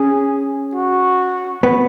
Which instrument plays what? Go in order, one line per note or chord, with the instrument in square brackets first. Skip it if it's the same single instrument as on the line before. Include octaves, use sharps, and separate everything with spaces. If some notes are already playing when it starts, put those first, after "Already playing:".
Already playing: [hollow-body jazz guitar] C#4 [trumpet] G#4
[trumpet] F#4
[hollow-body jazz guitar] B3